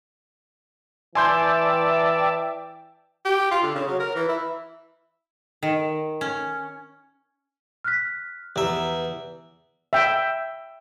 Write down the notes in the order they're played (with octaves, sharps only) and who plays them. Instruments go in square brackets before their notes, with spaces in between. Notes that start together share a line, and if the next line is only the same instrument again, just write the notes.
[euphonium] E3 [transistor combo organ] D5 E5 A5 [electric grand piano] G#5 C6 G6
[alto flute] G5
[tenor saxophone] G4
F4
D3
C#3
F#3
A#4
E3
E4
[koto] D#3
C#4
[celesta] F6 F#6 B6
[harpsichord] E2 E5 [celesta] G4 B4 A#5
[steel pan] E5 G5